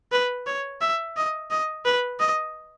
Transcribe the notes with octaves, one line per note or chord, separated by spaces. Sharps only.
B4
C#5
E5
D#5
D#5
B4
D#5